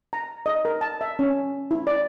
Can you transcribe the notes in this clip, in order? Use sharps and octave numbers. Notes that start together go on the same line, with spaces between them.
A#5
D#5
A#4
A5
E5
C#4
E4
D5